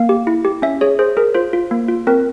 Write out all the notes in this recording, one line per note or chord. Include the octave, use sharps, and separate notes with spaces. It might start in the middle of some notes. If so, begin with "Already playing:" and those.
Already playing: A#3 F5
G4
E4
G4
C#4 E5
G#4 C#5
G#4 C5
G#4 A#4
F4 C5
F4
A#3
F4
C4 A#4